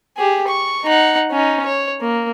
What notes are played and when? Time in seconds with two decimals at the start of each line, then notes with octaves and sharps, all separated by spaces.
0.17 G4 G#4
0.48 C#6
0.85 D#4 F#5
1.31 C#4 D#4
1.66 C#5
2.02 A#3